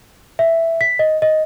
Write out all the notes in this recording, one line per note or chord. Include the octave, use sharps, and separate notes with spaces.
E5
B6
D#5
D#5